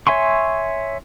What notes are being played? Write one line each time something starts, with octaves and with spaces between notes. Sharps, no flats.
C#5 E5 G#5 C6 C#6